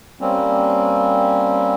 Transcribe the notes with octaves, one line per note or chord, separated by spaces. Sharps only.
G3 A#3 C4 C#4